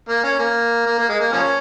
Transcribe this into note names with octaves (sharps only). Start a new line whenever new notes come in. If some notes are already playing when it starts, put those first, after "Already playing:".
A#3
C#4
A#3
A#3
A#3
G#3
A#3
F3 A#3 C#4